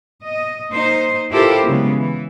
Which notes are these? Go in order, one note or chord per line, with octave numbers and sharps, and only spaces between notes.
D#5
A#3 D#4 C5
E4 F4 G4 A4 A#4 C5
C#3 F#3 G#3 B3
E3